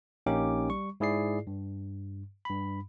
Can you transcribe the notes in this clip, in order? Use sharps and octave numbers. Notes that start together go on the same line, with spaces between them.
A#1 A#3 C#4 D#4 G4 D6
G3 C#6
G#2 E4 G#4 D5 C7
G2
G2 B5